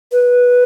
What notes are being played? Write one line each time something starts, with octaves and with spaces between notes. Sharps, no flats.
B4